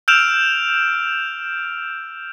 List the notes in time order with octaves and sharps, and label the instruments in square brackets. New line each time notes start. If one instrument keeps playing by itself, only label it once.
[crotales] E6 F6 G6 D7 E7 F7